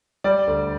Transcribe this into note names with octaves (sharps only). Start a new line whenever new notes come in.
G3 D5
D2